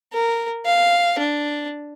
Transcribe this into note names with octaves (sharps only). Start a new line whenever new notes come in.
A#4
F5
D4